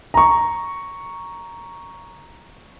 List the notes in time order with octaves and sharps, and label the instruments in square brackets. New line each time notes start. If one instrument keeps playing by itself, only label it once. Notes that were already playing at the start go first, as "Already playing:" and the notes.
[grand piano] A#5 C#6